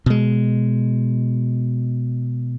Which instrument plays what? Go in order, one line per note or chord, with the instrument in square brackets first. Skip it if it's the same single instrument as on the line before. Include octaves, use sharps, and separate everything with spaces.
[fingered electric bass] B2 G#3